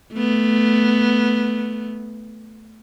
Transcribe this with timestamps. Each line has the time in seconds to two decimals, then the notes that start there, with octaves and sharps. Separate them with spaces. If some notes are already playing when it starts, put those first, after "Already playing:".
0.14 A3 B3